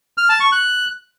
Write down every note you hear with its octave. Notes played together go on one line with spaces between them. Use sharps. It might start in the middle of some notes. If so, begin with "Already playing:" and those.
F6
A5
C#6
F#6